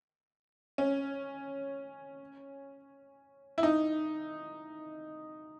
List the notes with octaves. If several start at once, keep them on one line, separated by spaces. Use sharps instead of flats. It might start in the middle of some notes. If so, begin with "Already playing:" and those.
C#4
E4
D#4